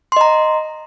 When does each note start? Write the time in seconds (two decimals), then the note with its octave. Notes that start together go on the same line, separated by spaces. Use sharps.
0.12 C6
0.17 D#5
0.21 A#5